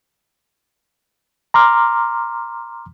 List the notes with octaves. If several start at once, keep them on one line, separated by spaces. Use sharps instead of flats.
A#5 C6 D6 F6